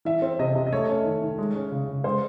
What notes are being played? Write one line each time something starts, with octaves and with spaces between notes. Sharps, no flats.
E3 E5
C4
C3 D#5
C3
D#5
A3 C#5
C#4
D#3
D#3
G#3
C#4
C#3
C#3
G#3 C5